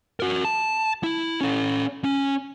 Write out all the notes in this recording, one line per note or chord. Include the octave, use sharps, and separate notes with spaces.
F#4 A#4
A5
E4
C#4 A4
C#4